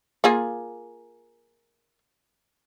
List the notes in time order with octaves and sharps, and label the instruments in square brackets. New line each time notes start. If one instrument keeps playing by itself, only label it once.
[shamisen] A#3 F4 G#4